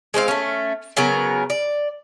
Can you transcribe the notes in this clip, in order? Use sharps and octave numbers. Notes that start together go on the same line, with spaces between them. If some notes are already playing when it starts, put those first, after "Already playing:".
G#3 C4 C5 F5
A3 C#4
C#3 F#3 B3 A#4
D5